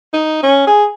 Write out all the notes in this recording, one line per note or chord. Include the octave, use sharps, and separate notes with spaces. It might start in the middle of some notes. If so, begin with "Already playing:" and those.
D#4
C#4
G#4